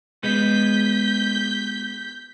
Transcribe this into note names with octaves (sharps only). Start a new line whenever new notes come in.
G#3 B3 G6 B6